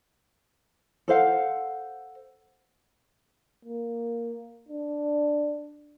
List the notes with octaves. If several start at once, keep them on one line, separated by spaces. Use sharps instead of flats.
A4 C5 F5 F#5
A#3
D4